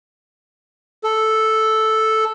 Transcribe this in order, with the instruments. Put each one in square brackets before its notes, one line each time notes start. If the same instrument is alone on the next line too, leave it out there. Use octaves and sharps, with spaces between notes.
[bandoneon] A4